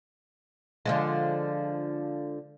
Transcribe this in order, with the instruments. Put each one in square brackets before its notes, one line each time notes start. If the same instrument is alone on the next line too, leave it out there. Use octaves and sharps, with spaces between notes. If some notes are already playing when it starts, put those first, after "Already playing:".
[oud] D3 F3 G#3